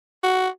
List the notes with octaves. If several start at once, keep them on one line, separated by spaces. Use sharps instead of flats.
F#4